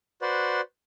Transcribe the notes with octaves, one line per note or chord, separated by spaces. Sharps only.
F#4 B4 C5 D5